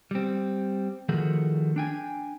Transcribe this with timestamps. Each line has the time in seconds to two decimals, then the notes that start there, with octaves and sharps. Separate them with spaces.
0.11 G3 C4
1.09 D#3 F3 A3 F#4 G#4 A#4
1.76 D4 G5 G#5